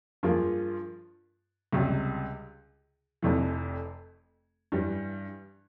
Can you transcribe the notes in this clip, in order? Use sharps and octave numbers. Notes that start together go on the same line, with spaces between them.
G2 F3 A#3 F4 G#4
C#2 C3 G3
F1 F2 C3 E3
G2 E3 G3